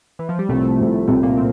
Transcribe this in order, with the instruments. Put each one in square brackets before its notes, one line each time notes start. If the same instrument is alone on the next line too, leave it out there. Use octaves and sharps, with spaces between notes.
[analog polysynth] E3
F3
G3
[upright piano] C2 C3 F3 [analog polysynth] A2 A3
[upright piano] C2 C3 F3
[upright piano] C2 C3 F3 [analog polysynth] A2 A3
[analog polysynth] A#2 A#3
C4